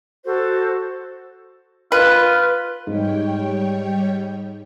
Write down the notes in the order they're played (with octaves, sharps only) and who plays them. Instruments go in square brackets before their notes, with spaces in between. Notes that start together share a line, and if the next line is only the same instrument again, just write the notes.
[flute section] F#4 A4 C5
[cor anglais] F4 [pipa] B4
[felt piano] G#2 [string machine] G3 C#5 G5